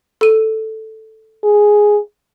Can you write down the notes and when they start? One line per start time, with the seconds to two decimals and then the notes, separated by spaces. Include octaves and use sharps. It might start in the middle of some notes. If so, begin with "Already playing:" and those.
0.21 A4 D#7
1.44 G#4